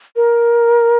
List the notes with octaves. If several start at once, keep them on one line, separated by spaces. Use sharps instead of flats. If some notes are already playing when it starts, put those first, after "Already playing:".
A#4